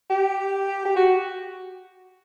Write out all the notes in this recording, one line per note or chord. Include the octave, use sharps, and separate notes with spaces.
G4
G4
F#4